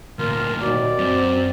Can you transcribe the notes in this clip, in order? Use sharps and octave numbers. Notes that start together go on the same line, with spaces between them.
D2 A#2 F4 A#4
D#2 F#4 D5
F#2 C4